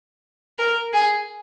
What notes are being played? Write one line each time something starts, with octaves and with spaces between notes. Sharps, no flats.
A#4
G#4